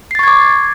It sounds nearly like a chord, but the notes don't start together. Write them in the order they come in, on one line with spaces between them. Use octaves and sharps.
C7 A6 C#6 G#6 D6